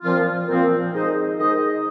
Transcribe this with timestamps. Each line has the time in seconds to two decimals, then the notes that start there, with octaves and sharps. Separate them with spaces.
0.02 A#2 F3 C4 F4
0.48 A#2 F3 C4 F4
0.93 D#3 G#3 D#4 C5 D#5
1.38 D#3 G#3 D#4 C5 D#5